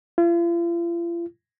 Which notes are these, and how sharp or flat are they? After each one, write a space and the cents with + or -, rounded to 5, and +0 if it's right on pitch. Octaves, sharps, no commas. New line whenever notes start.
F4 -45